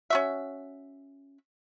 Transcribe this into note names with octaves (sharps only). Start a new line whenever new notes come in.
C#4 F#4 E5